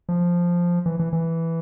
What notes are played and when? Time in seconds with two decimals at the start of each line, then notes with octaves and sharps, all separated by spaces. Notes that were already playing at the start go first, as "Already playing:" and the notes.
0.09 F3
0.86 E3
0.99 E3
1.13 E3